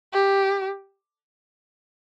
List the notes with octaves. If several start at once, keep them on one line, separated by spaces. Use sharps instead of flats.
G4